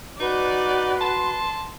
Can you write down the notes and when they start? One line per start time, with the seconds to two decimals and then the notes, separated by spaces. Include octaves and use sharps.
0.20 D#4 F#4 B4 D5
1.01 A5 C6